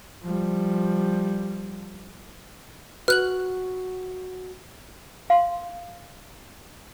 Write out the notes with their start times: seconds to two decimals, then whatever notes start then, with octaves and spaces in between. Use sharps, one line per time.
0.23 F3 G3
3.08 F#4 B4 F6 F#6 F#7
5.30 F5 C6